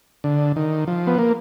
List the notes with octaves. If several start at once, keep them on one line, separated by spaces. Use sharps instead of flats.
D3
D#3
F3
B3
A#3